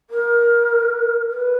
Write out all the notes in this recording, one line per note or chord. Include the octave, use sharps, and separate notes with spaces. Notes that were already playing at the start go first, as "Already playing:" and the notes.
A#4
B4